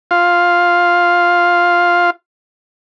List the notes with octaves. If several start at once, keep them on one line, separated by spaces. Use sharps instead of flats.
F4 F5